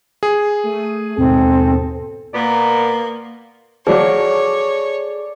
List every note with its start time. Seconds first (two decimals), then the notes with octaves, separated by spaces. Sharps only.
0.23 G#4
0.63 A3 D#7
1.17 D#2 G#2 B2 C4 A4
2.34 A#2 A#3 B3 D5
3.87 F3 F#3 G#4 A4 C#5 D5 D6